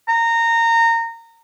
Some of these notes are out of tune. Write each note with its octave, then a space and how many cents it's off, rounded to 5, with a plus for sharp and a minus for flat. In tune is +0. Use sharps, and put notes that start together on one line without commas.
A#5 -20